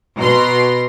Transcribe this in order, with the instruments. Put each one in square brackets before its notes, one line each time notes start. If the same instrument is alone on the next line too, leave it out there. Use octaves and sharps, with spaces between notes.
[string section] B2 A#5 C6